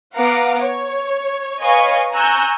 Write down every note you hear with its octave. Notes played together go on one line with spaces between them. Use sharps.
B3 F5 F#5 A#5 D6
C#5
B4 C#5 D#5 F5 G#5 C#6
G#5 A#5 C#6 E6 F#6 G6